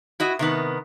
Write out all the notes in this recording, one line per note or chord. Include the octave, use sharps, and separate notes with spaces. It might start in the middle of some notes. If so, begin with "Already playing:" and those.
E4 F#4 D#5
C3 D#3 B3